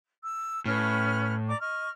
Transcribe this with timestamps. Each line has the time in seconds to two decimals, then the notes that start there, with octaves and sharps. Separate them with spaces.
0.23 E6
0.66 A2 C#4 B4 F6
1.47 D5 A#5 D6
1.60 D#5 C#6 F6